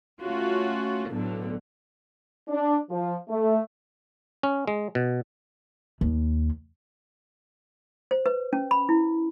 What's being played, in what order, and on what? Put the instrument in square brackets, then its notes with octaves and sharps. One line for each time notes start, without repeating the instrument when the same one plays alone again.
[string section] A3 C#4 F4 F#4
B1 A2 D3 F#3
[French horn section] D4
F3
A3
[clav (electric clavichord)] C#4
G#3
B2
[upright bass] D#2
[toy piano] C5
B4
C#4
B5
E4